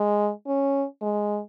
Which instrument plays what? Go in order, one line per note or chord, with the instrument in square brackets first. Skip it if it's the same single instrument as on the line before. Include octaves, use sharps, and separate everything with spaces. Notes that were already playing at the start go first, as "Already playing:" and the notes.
Already playing: [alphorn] G#3
C#4
G#3